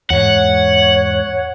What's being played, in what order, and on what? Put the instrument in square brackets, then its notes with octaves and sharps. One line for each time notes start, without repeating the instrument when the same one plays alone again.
[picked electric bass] E2 G#2 [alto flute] C#5 [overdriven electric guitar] F#5